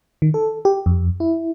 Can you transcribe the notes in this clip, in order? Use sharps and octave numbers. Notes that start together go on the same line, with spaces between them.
D#3
A4
G4
F2
E4